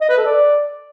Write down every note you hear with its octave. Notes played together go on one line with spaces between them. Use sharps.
D#5
B4
A4
D5